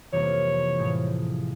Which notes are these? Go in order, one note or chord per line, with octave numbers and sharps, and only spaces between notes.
F2 C3 E3 G3 A#3 C#5
A2 F3 G#3